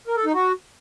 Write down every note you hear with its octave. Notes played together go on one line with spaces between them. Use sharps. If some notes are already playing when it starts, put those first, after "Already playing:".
A#4
A4
D#4
F#4